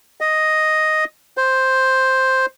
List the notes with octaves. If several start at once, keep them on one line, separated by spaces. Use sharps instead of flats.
D#5
C5